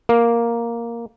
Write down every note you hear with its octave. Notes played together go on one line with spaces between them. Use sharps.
A#3